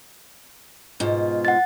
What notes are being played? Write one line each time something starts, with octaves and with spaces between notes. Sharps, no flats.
G#2 B2 F4
F#5 A6